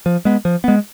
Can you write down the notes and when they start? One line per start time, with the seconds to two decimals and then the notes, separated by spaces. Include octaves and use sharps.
0.06 F3
0.25 G#3 B3
0.45 F3
0.64 G#3 B3